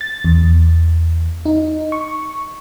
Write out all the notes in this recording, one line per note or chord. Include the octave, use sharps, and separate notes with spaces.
A6
E2
D#4
C#6